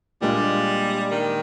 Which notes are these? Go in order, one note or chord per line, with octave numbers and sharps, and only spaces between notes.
A#2 G3 G#3 D4 F4
D#3